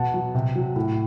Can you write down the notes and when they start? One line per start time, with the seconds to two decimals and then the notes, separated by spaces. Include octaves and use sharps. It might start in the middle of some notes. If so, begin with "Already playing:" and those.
Already playing: B2 F#5 A5
0.14 F#3
0.35 C3
0.56 F#3
0.76 A2